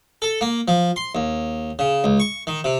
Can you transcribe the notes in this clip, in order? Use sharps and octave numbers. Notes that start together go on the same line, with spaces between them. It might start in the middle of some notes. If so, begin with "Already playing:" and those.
A4
A#3
F3
C6
D#2
C#3
C#2
C#6
D#3
C3